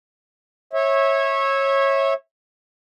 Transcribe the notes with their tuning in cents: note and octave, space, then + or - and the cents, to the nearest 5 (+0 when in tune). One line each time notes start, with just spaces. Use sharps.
C#5 -20 E5 -15